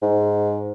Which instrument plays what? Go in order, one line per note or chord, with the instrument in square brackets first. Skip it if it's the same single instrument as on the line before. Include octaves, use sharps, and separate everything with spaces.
[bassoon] G#2